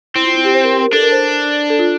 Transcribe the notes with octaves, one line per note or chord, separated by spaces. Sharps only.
C4 E4
F4
E4
G4
C5
A#4
G4
A#4
D4 A4
A#4
C5
A4
F4